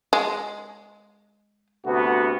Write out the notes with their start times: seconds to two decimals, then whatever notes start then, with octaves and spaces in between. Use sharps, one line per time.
0.13 G#3
1.86 D2 C3 B3 F#4